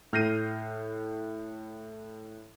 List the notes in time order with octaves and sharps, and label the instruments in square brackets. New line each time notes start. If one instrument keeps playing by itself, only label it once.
[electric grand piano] A2 F6 G6 A#6 C7 D#7